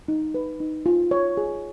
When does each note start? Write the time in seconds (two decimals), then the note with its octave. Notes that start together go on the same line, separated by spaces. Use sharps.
0.08 D#4
0.34 B4
0.60 D#4
0.86 F4
1.11 C#5
1.37 G#4